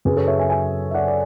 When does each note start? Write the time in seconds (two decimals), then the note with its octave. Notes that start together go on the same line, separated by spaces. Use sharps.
0.05 F#2 C#3 F#3 G#4 B4
0.17 A4 C#5
0.27 C#5 E5
0.39 E5 G#5
0.50 E5 G#5
0.91 E5
0.94 D5 F#5
1.08 D5